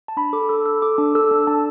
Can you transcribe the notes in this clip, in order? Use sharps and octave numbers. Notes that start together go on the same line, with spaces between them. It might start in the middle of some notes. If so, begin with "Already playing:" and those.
A5
D4 B5
A4 D6
A4 E6
A4 E6
A4 D6
D4
A4 E6
D4
D4 A5